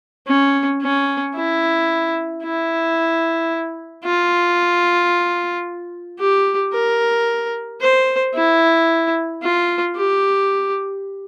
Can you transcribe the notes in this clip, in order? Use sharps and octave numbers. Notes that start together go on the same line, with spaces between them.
C#4
C#4
E4
E4
F4
G4
A#4
C5
E4
F4
G4